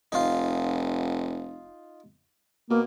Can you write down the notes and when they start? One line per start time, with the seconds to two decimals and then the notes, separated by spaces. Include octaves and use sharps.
0.12 F1 D#4 F4
2.70 B2 A#3